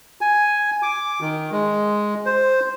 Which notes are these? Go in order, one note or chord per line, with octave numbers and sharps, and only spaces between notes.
G#5
D6
D#3
G#3
C5